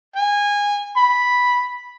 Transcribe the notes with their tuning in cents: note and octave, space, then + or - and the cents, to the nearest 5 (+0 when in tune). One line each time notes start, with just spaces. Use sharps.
G#5 -20
B5 -5